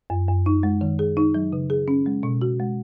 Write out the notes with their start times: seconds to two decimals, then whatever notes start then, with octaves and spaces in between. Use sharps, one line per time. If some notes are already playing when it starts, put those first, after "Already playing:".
0.10 F#2
0.28 F#2
0.46 D#4
0.63 G#3
0.81 D#3
0.99 G#4
1.17 D#4
1.34 F#3
1.53 C#3
1.70 G#4
1.88 C#4
2.06 G#3
2.23 B2
2.42 F#4
2.60 G#3